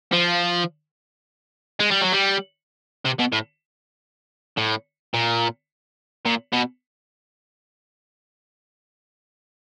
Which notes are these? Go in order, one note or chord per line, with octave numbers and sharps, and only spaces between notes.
F3
G#3
G3
F#3
G3
C3
B2
A2
A2
A#2
A#2
B2